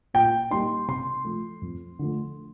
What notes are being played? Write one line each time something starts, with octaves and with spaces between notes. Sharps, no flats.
A#2 G5
G3 A#3 D#4 C6
C3 C6
F3 A3
F2
D3 F3 A3